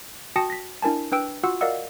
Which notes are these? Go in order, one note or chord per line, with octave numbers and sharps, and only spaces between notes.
F#4 G5 A5 D#6 A#6 C#7
A#6 B6
D4 E4 A#4 G#5 A5
D4 B4 G5 E6 D7
F4 F#4 F#5 E6
A#4 D5 D#5 F5 F#5 E6